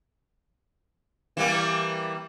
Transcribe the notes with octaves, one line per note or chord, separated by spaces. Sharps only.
E3 G3 A#3